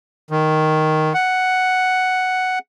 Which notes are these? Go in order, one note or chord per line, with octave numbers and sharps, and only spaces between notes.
D#3
F#5